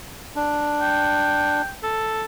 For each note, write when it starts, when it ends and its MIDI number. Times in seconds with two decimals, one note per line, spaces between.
0.36 1.62 62
0.82 1.72 79
1.83 2.25 69